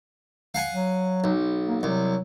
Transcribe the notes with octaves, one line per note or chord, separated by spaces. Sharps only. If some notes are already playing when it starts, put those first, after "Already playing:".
F5 F#5 G#5
F#3
B1
A#3
C2 F#3